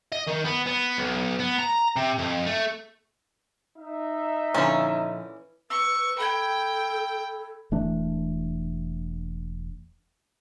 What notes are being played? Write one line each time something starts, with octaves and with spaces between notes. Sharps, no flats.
D#5
D#3
B3
B3
B1
B3
A#5
C3
F2
A3
D#4 E5
A#2 D3 E3 F3 C#4
B4 C#6 E6
A4 G5 B5 G#6
E1 E3 A3 D4